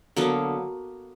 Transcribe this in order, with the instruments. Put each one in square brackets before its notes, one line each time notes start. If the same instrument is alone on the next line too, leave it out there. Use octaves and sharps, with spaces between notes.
[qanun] D3 F#3 A#3 B3